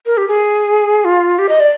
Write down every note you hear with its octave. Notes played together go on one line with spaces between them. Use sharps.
A#4
G4
G#4
F4
G4
D#5
D5